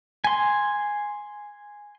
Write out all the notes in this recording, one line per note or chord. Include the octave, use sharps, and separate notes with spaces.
G#5 C6